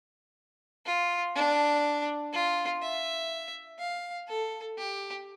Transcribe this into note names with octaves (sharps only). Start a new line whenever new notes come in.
F4
D4
F4
E5
F5
A4
G4